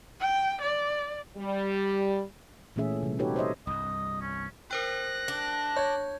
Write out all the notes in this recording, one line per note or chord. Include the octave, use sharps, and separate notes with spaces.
G5
D5
G3
A#2 E3 A3 C#4 G#4 E5
C3 G3
D#4 F#4 G4 A4 B4 C#5
C5 C#5 D#5 E5
C2 G2 D#5
C#4
A#4 C5 G5 F#6 A#6
D4
C#5 G6 G#6